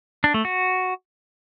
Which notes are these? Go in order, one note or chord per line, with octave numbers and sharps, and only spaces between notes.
D4
A3
F#4